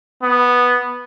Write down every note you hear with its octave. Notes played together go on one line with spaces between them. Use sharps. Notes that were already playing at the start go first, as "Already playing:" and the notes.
B3